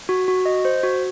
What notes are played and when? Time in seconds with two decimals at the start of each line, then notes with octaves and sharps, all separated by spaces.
0.09 F#4
0.28 F#4
0.46 D#5
0.65 C5
0.83 F#4